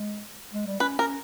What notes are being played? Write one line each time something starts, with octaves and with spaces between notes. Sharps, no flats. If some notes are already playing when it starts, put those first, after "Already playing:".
Already playing: G#3
G#3
G3
C#4 B4
C#4 A#4